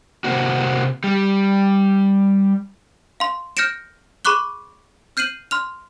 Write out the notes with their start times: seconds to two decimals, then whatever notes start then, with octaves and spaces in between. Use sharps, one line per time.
0.24 C3 A#3 C4 F#4
1.04 G3
3.20 F5 C6
3.57 F6 G6 A#6 C#7 D7 E7
4.25 G#4 B5 C#6 D6 F#6 G7
5.17 F6 G6 C7 D#7 F#7
5.51 C6 F6 F7